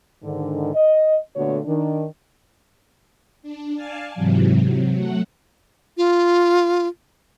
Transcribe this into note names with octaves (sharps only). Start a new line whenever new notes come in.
G#2 D3 D#3
D#5
A#2 D3 A3 B3 F#4 C#5
D#3 D4
D4
D5 F5 G#5 A5
G#2 C3 E3 F#3
C3 F#3
F#3 A3 F#5
F4